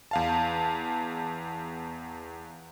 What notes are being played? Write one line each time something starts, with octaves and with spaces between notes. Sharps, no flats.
E2 F5 A5